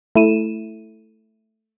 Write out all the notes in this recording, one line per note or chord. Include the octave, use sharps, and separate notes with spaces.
A3 E4 D#7 E7